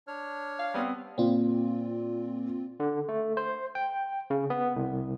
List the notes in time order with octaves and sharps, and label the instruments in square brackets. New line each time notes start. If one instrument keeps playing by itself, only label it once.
[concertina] D4 C#5 F6
[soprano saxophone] F5
[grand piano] G3 B3 C4
[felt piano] A#2 [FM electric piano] C4 F4
[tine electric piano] D3
A3
C5
G5
C#3
B3
C2